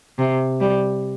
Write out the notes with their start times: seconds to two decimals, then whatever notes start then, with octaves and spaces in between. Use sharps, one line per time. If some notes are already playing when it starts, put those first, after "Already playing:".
0.18 C3
0.60 G3